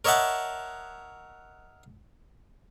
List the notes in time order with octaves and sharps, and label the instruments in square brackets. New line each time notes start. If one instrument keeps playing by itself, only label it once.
[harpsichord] A#4 C#5 D#5 E5 F#5 A5